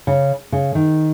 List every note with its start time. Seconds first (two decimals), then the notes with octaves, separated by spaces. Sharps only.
0.07 C#3
0.52 C#3
0.75 D#3